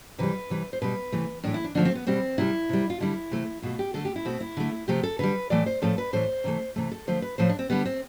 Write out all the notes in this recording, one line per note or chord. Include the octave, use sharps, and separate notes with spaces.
C3 E3 G3 B4
C3 E3 G3
C5
B2 G3 B4
C3 E3 A3
A2 E3 A3 D4
E4
D4
D3 F3 A3 D4
C4
B3
B2 G3 C4
C3 G3 E4
C3 G3
F4
D3 G3 E4
C3 E3 A3
B2 A3 F4
G4
D3 A3 A4
G4
E4
B2 A3 C4
E4
D3 A3
C3 F3 A3 G4
A4
D3 G3 B4
A2 E3 A3 D5
C5
A2 F3 A3 A4
B4
A2 E3 A3 C5
C3 E3 A3
C3 E3 A3
A4
D3 F3 A3 C5
B4
A2 F3 A3 C5
D4
C4
D3 G3 B3
C4